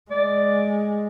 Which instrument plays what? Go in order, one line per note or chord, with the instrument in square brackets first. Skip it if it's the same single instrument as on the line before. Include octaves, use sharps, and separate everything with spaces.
[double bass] G#3 [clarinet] D5